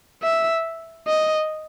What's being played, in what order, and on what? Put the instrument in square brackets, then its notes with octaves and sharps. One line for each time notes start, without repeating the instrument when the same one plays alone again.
[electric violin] E5
D#5